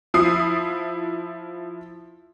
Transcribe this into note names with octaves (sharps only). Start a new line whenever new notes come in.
F3 E4 D#6 C7